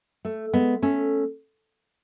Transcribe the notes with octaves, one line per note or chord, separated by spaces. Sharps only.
A3
G#3 B3
A3 C#4